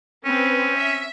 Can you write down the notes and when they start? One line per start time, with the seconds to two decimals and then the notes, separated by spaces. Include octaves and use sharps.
0.25 C4 C#4 B4
0.77 E5